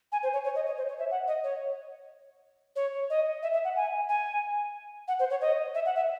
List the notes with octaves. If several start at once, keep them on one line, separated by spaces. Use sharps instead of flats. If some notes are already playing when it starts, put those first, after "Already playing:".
G#5
C5
C#5
C#5
D#5
C#5
C5
C#5
E5
F#5
D#5
C#5
C#5
D#5
E5
E5
F#5
G#5
G#5
F#5
C5
C#5
D#5
E5
F#5
E5